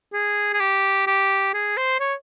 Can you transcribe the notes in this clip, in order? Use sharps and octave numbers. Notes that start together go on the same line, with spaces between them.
G#4
G#4
G4
G4
G#4
C5
C#5